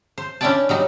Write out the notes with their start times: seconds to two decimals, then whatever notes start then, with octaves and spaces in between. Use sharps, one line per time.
0.18 C5
0.41 C#4 D4 E4 D5 G5 A5
0.69 F#3 G3 D#4